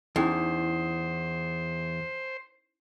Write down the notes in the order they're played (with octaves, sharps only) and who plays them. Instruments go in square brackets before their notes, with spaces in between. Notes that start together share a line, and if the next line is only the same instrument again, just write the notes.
[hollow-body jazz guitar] E2 [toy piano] C#4 D#4 E4 [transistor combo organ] C5